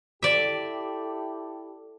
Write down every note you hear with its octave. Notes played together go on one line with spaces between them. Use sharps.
E4 G4 A4 D5 E5